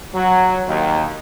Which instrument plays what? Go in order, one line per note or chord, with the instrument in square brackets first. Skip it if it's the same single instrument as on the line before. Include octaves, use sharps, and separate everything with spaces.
[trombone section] F#3
D#2